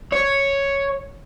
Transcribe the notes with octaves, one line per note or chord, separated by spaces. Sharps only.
C#5